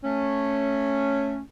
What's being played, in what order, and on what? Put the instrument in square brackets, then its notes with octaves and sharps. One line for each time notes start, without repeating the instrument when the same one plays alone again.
[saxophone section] A3 C#4